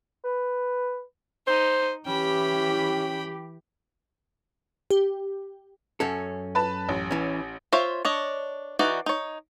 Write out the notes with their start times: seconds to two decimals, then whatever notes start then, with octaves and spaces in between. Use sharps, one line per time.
0.24 B4
1.47 D#4 C5
2.06 E3 C#4 G4 G5 B5
4.91 G4
6.00 F#2 C#4 A4
6.55 B4 A5
6.89 A1
7.11 E3 C#4
7.72 F4 C5 C#5 E5
8.05 D4 C#5 D#5
8.79 E3 D#4 F#4 D5
9.06 D#4 C#5